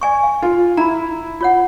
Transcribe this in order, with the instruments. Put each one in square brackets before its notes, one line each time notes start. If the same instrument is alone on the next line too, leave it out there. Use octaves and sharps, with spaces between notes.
[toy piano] D5 G#5 C#6
F5
[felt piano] F4
[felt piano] E4 [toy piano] A#5 B5
[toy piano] F4 C#5 F#5